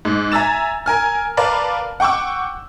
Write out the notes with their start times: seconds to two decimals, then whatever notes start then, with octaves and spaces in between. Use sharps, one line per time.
0.05 G#2
0.32 E5 G#5 A#5 E6 A6 E7
0.86 A#4 G#5 F6
1.37 A#4 B4 D5 F5 A5 F6
2.00 F#5 G5 C#6 D6 E6